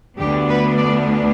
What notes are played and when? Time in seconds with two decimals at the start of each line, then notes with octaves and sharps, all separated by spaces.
0.19 D2 D3 B3 D4 G4
0.48 B4
0.77 D5